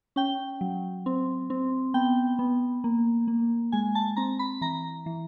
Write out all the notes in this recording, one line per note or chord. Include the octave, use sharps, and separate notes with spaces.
C#4 G5
F#3
C4
C4
B3 G5
B3
A#3
A#3
G#3 G#5
A5
C4 A#5
B5
E3 A#5
E3